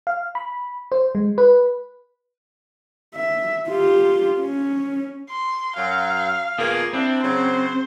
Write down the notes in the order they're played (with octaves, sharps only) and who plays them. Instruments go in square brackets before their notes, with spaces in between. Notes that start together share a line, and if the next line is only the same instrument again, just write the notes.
[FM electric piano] F5
B5
C5
G#3
B4
[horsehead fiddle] E5
F4 G4
C#4
[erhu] C6
[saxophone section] F#2 F#3 [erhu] F5
[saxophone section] A#3 G#4 [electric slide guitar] B3 F4
[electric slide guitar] C4 [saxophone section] D4 [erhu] E4
[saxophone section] C#3 F#3 [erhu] C5